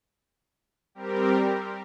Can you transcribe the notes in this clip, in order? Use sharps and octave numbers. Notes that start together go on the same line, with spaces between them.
G3 C4 G4 A#4